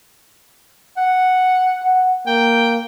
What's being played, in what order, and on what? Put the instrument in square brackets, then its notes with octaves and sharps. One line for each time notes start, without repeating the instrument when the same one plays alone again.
[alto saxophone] F#5
[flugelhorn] F#5
[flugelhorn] A#3 [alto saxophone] G5